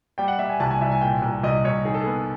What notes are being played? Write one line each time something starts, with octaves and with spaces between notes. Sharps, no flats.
G3 G5
F#5
G3 E5
G#5
C2 A5
G#5
C2 E5
G#5
A#2 G5
C2
C2 D#5
C2 C#5
D#3 G#4
A4
G#4
B3